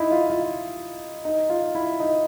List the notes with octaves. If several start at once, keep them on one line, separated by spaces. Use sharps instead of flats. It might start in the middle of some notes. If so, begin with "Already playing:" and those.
Already playing: D#4 E4
F4
F4
D#4
F4
E4
D#4